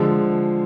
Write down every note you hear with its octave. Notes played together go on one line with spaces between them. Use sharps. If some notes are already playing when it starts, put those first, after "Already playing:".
Already playing: D3 F3 G#3